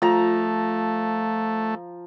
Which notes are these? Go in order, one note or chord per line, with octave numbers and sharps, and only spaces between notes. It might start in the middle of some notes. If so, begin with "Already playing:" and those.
F3 A3 A#5